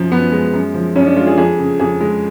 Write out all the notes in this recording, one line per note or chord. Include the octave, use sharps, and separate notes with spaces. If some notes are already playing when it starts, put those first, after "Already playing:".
Already playing: F#2 F3
F#2 B3
G#3
F#2
F3
F#2 C#4
D4
G#3 F4
G#4
F2 G#4
C#3
F2 G#4
G#3